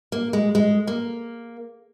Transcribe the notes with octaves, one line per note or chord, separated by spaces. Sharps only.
A#3
G#3
G#3
A#3